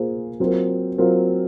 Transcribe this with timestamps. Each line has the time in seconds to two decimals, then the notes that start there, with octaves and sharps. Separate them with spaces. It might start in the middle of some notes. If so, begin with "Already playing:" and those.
Already playing: A#3 F4 G#4 C5
0.40 F#3 C4 F4 A#4
0.98 F#3 C4 F4 A#4